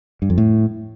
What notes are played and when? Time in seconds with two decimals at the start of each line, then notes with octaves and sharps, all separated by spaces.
0.22 G2
0.30 F2
0.38 A2